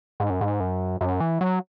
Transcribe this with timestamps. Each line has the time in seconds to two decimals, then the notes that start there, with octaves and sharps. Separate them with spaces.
0.20 G#2
0.30 F#2
0.41 G#2
0.60 F#2
1.01 F#2
1.20 E3
1.41 F#3